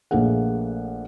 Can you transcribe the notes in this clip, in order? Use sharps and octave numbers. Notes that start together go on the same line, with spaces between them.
A#1 A3 A#3 G#4 F#5